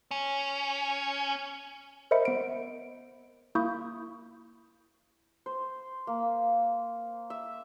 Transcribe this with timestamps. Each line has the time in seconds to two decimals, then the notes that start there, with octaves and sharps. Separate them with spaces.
0.11 C#4
2.11 A#4 C5 D#5 E5 B5 C#7
2.25 B3 D7
3.55 A#3 E4 B5 C#6 D#6 G6
5.46 C5
6.07 A#3
7.30 E5